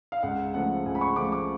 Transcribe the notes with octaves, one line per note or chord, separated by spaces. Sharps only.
F5
C#2 F#5
C#3 F3 A3 F#5
C#2 G#5
B5
C#6
C#3 F3 A3 D6
D6